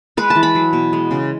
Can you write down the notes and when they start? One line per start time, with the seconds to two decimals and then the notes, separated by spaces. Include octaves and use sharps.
0.17 G#3 B4
0.30 A5
0.35 E3
0.43 B5
0.55 F#3
0.73 B2
0.93 G#3
1.11 C#3